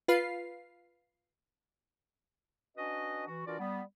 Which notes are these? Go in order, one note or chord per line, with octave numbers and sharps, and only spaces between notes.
F4 B4 F5 C7
C#4 D4 F#4 B4 D#5
E3 F#4
E3 D4 F4 F#4 A#4 D5
G3 B3